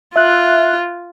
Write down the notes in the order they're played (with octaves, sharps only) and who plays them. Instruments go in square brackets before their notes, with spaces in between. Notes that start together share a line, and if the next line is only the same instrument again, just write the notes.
[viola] F4 [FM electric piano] E5 F#6